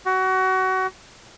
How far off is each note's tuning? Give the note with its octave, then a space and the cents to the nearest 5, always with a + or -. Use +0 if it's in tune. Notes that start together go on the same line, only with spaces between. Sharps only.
F#4 +25